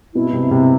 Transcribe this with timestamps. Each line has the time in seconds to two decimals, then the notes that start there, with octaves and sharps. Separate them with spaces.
0.14 B2 E4
0.33 C3
0.51 C3